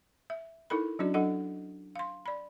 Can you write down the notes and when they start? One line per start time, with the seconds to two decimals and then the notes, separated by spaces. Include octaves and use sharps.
0.30 E5
0.70 D#4 E4 A4 A#4 B5
0.99 F#3 C#4 D4 F#4 D5
1.14 F#3 D4 A4 D#5 F#5
1.95 F5 C6
2.26 D5 B5